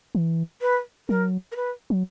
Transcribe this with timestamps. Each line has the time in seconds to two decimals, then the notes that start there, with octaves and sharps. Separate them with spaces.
0.15 E3
0.61 B4
1.09 F#3 A#4
1.52 A#4
1.56 B4
1.90 F#3